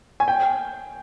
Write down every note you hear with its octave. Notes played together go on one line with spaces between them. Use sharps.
G#5
G5